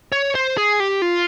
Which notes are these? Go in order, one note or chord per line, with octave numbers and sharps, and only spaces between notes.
C#5
C5
G#4
G4
F4